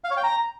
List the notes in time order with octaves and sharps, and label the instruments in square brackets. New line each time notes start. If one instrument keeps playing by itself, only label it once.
[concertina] F5
C#5
G5
A#5